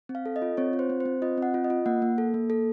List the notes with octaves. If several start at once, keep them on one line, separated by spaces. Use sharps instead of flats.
C4
F5
A4
D#5
F4
C4 C#5
F4
C5
C4
C5
C4
F4 D#5
C4 F#5
F4
D#5
F4
A#3 F#5
A#3
A4
A#3
A4